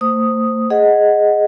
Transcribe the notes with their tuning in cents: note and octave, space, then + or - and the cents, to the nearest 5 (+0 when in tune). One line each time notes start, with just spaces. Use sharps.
A3 +45 C5 +0 D#6 +0
G#4 +0 D#5 +0 F#5 +0